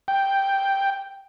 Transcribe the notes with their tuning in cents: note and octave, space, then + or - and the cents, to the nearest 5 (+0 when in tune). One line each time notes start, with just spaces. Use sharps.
G5 +0